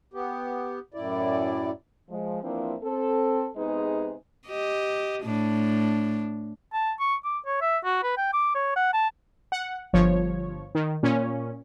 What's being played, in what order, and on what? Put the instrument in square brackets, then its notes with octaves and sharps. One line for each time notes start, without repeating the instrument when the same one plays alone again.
[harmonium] B3 G4
F#2 A2 E4 D5
[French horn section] F3 G#3
E3 F3 A#3 C4 D4 E4
C4 A4
C3 G#3 B3 D#4 G#4 B4
[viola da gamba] G4 D#5
A2 D4
[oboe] A5
C#6
D6
C#5
E5
F#4
B4
G5
D6
C#5
F#5
A5
[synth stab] F#5
G1 F3 C#5
D#3
A#2 C#4